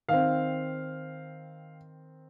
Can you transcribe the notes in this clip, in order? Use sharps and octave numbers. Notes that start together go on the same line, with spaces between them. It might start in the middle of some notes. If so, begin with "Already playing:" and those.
D#3 C4 F5